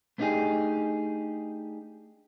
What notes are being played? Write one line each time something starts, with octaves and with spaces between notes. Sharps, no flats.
A3 B3 D4 D#4 G4 G#4